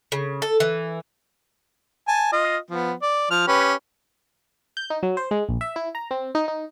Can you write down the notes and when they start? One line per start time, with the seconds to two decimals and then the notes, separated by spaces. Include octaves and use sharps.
0.12 C#3
0.42 A4
0.60 E3
2.08 G#5 A5
2.32 F4 D#5
2.70 F3 B3
3.02 D5
3.30 F3 F6
3.47 C#4 G4 B4
4.77 G6
4.90 D#4
5.03 F#3
5.17 C5
5.31 G#3
5.49 A#1
5.61 E5
5.76 E4
5.95 A#5
6.11 C4
6.35 D#4
6.48 D#4